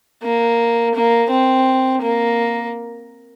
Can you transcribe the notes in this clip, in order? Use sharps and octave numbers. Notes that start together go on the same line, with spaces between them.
A#3
A#3
C4
A#3